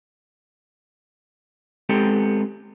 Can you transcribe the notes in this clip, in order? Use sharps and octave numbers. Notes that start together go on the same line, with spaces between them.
G#3 B3 C4 G4 A4